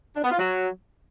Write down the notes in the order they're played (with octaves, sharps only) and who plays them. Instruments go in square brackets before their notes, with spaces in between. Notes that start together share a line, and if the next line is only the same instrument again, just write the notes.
[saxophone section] D4
B3
F4
F#3